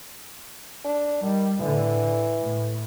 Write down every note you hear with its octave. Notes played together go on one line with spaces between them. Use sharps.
D4
D#3 G3
A2 D3 E3
A2